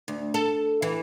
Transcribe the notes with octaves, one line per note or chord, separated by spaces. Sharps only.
D2
A4
E3